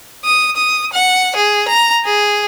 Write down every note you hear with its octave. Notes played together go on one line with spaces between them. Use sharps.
D#6
D#6
F#5
G#4
A#5
G#4